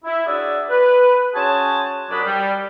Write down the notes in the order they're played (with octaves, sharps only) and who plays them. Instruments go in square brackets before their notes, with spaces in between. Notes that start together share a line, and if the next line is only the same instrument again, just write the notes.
[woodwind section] E4
D4 F#4 G#4 C#5 D5 E5
B4
C#4 F#4 G#4 C5 G#5 A5
C2 F#3 D4 D5 B5 D#6
G3